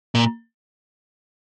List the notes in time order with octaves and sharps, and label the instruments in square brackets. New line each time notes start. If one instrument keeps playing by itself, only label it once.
[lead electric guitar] A#2